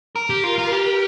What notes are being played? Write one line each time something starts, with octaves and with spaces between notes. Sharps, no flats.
A#4
G4
F4
F4
G4